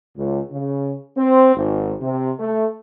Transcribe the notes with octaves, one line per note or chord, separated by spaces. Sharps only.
C#2
C#3
C4
G#1
C3
A3